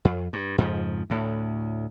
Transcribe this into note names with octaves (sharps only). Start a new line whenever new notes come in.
F2
G2
F2 G#2 C#3 F3
D2 A2